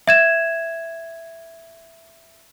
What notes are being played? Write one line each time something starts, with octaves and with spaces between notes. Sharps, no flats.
E5 G#6 E7